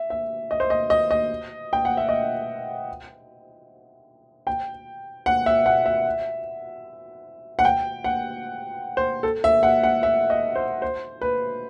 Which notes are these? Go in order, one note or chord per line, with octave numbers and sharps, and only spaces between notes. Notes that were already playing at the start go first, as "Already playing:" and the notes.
Already playing: E5
E5
D#5
C5
D#5
D#5
D#5
G5
F#5
E5
D#5
G5
F#5
E5
F#5
E5
F#5
G5
F#5
C5
A4
E5
F#5
F#5
E5
D#5
C5
C5
B4